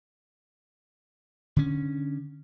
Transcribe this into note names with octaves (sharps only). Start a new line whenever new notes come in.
D3 C#4